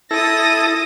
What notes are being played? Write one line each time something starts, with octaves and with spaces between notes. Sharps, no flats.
E4 A4 D#6 A#6